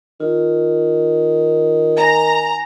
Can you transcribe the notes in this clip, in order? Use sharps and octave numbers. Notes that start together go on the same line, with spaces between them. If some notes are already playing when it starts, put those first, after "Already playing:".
D#3 F4
G#5 A#5